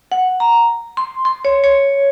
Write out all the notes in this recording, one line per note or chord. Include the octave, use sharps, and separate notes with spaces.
F#5
A#5
C6
C6
C#5
C#5